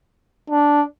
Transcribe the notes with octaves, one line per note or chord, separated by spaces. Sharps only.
D4